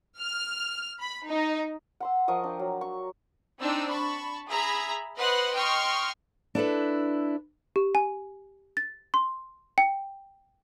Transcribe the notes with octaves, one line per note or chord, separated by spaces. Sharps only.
F6
B5
D#4
F#5 C6 E6
F3 A#4 D#5 C#6
D4 G5
F#3
C#6
C4 D4 D#4 D5 E6
A5 B5 C#6
G#4 E5 A#5 B5
B4 C5 D#5 F#5 C6 F#6
D#5 G5 C6 C#6 F6
D4 E4 A4 B4
G4
G#5
A6
C6
G5